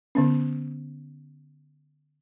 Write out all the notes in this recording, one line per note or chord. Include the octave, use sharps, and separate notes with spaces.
D3 B3 C#4